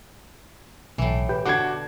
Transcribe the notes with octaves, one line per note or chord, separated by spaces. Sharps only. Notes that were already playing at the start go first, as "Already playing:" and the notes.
B1 A2 E3
G4 B4 G5
B2 D3 F#4 G5 D6 G#6